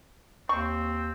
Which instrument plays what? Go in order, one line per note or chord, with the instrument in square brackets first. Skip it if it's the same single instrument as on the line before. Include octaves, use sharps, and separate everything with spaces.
[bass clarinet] D#2 [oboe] C4 [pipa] C#6